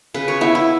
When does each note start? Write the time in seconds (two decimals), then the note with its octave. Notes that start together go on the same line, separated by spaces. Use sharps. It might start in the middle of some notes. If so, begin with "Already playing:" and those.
0.14 C#3 B4
0.28 C#5
0.41 B3 E4
0.55 E4